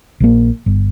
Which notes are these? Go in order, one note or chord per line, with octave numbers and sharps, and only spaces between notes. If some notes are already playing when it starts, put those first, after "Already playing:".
A#1 F3 A#3
G1